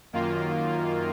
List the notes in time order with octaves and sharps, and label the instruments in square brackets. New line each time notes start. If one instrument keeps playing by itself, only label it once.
[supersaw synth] F#2 D#3 A#3 F4